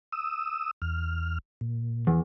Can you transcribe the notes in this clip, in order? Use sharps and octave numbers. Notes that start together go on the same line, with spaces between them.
D#6 E6
E2 F6
A#2
E2